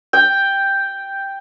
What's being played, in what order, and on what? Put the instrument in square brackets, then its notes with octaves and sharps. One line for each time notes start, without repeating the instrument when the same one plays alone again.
[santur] G5